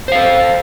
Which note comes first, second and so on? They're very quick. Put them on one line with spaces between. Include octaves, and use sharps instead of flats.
C5 F5 A4